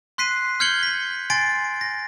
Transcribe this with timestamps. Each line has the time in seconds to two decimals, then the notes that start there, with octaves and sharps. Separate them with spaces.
0.18 C6 F#6 B6 C7 D#7
0.60 F6 G6 G#6 C#7 F#7 G7
0.83 B6
1.30 G#5 C6 A6 C7 D7
1.81 A#6